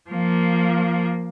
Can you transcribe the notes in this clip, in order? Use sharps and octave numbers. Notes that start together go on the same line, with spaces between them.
F3 A#3